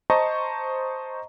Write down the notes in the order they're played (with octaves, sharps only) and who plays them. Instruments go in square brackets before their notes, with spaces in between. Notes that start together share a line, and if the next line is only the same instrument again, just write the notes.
[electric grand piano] C5 D#5 A5 A#5 C#6